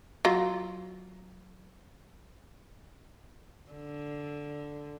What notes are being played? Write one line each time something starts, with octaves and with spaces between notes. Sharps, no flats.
F#3 F4
D3